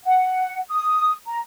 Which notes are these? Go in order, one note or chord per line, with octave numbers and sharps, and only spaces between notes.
F#5
D#6
A#5